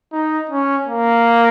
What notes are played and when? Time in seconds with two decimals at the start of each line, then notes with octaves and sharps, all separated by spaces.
0.12 D#4
0.50 C#4
0.86 A#3